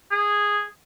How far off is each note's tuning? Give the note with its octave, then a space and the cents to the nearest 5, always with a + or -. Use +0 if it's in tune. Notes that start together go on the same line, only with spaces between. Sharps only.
G#4 -10